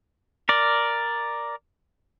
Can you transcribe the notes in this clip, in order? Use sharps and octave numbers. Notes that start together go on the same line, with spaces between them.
A#4 D5